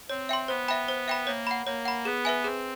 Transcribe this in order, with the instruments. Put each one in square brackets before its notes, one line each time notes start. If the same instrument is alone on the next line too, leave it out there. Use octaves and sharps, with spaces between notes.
[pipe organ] C4 [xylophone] C#5
[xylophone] E5 G5 C6
[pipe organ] B3 [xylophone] C5
[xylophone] E5 G5 B5
C5
E5 G5 B5
[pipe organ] A#3 [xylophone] C#5
[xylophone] F#5 B5
[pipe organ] A#3 [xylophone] C#5
[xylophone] F#5 B5
[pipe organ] B3 [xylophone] G#4
[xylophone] B4 E5 G#5
[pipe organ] C4 [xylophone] G#4